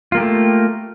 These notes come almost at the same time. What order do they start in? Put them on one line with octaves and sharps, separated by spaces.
F4 A#3 G4 A3